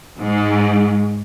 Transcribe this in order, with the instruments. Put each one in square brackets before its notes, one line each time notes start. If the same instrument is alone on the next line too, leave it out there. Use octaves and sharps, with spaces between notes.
[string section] G#2